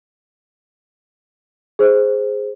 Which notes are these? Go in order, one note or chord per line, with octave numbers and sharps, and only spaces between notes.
G#4 C5